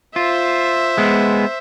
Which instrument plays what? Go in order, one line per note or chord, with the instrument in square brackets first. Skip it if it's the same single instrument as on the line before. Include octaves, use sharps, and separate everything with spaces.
[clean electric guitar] F4 [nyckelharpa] C5 E5
[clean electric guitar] G#3 B3